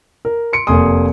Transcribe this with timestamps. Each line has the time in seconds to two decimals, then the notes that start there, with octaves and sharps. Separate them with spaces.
0.25 A#4
0.53 C6 C#7 D7
0.67 F1 A#3 G#5 C6 D#6